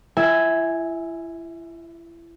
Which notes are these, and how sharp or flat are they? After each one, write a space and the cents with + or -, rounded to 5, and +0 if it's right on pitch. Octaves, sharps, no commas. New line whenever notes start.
E4 +30 E5 -15 G#5 +0